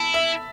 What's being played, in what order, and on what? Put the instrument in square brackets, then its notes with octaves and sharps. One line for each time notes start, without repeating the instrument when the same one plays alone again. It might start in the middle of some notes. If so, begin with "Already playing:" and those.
Already playing: [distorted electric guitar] E4 [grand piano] A5 B5
[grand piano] E5